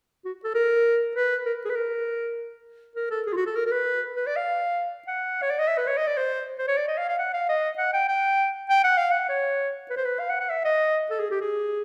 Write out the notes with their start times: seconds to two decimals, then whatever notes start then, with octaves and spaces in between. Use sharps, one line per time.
0.25 F#4
0.44 A4
0.55 A#4
1.15 B4
1.46 A#4
1.65 G#4
1.70 B4
1.75 A#4
2.96 A#4
3.10 A4
3.27 G#4
3.32 F4
3.36 F#4
3.46 A4
3.56 A#4
3.66 A#4
3.71 B4
4.16 B4
4.26 D5
4.36 F5
5.07 F#5
5.42 C#5
5.50 D5
5.59 D#5
5.68 E5
5.78 B4
5.87 C#5
5.97 D#5
6.07 D5
6.17 C5
6.58 C5
6.67 C#5
6.77 D5
6.88 D#5
6.98 F5
7.08 F5
7.18 F#5
7.34 F5
7.49 D#5
7.78 F#5
7.93 G5
8.08 G5
8.70 G5
8.84 F#5
8.97 F5
9.11 F#5
9.29 C#5
9.90 B4
9.97 C5
10.05 B4
10.19 F5
10.29 F#5
10.40 F#5
10.50 E5
10.65 D#5
11.10 A4
11.20 G#4
11.31 G4
11.41 G#4